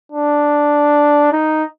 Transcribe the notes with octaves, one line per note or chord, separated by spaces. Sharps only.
D4
D#4